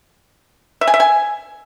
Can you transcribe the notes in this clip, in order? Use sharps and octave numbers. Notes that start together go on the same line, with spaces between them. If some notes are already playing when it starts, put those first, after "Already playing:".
E5
G#5
E5
G#5